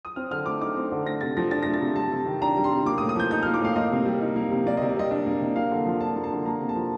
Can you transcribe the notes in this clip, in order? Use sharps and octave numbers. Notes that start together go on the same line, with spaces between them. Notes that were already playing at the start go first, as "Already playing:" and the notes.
D#6
C4 F6
D3 F6
A3 D6
D#4 D6
C4
D3
A3 A#6
C3 A6
F3 A#6
D4 A6
A#6
A3
A6
C3
G3 A5
C3
D#3
D4 A#5
G3
C6
C3
A#3 D6
D#6
A2
D#6
F3 G6
D#4 G6
F6
A#3
D6
A2 F5
A#3 D#5
C3
G3
D#4
A#3
C3
A#3 D5
D#5
C3
D5
G3 D#5
D4
A#3
C3
A#3 F5
D3
F3
D4 A5
A#3
A5
D3
A#3 A#5
C3
A5
F3